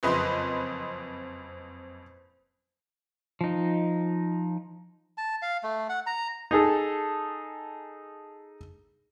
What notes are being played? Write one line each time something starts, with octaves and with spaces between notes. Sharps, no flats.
F#1 F2 B4 D#5 C6
F3 D#4
A5
F5
A3
F#5
A#5
D#4 G#4 A4